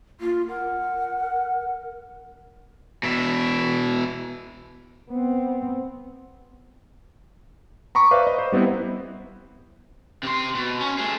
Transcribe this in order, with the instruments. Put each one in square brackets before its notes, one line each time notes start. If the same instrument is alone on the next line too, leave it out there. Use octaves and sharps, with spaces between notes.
[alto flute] A#3 [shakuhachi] F4
[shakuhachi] A#4 [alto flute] F#5
[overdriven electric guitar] B2 E4
[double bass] B3 C4
[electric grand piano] A#5 B5 C#6 D6
B4 C5 D5 E5 F5
D#5
C5
G3 B3 C4 E4 B4
[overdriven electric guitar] C3 C6
B2
C#4
A3 G#4